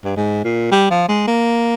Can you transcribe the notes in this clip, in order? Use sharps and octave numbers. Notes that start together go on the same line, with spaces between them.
G2
G#2
A#2
G3
F3
G#3
A#3